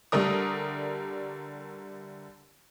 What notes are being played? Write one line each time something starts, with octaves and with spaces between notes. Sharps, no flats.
D3 G3 A3 A#4 D#6